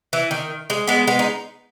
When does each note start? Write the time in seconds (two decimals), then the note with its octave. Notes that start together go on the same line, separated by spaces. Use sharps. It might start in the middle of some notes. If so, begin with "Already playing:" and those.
0.13 E3
0.31 D#3
0.70 G#3
0.88 G#3 B3
1.07 G#3 B3
1.19 D#4